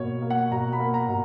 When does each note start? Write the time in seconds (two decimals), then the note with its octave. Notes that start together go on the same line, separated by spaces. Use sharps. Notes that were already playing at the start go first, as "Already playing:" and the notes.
Already playing: B2 A#3 C#5
0.22 A#3
0.30 F#5
0.51 B2 A#5
0.73 B5
0.80 A#3
0.94 A#5
1.09 B2